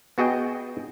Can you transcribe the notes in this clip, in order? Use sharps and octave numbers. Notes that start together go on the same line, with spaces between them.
B3 F#4 G#4 D#5 G5